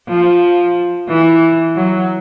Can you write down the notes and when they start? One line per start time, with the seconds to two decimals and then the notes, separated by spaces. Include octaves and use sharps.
0.08 F3
1.08 E3
1.76 F#3